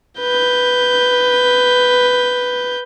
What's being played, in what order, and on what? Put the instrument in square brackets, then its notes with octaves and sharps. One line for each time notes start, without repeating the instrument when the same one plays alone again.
[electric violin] B4 G6